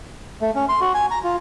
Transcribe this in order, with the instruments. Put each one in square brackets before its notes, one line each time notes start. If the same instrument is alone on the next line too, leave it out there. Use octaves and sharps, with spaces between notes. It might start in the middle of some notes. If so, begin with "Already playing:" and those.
[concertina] A3
C#4
C6
F#4
G#5
A#5
F4